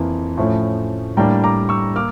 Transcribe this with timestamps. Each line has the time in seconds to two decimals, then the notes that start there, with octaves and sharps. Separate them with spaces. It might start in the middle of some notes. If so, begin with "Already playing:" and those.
Already playing: F2 E3 A#3
0.37 A2 F3 A3 C#4
1.17 A2 G3 A#3 D4 G5 A#5
1.44 A#5 D6
1.69 C#6 E6
1.96 A#3 D6 F6